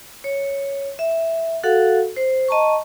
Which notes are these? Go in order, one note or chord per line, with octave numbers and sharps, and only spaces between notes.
C#5
E5
F#4 A4 F5 F#5
C5
D#5 A5 A#5 C#6